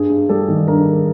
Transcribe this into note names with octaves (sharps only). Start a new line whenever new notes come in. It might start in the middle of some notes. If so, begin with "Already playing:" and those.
Already playing: G2 G#4
G2
G3 A4
D#3
G2 A#4
G2